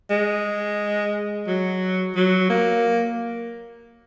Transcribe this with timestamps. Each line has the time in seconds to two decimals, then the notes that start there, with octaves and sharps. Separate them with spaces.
0.10 G#3
1.47 F#3
2.16 F#3
2.50 A#3